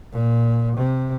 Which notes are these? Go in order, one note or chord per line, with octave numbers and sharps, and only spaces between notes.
A#2
C3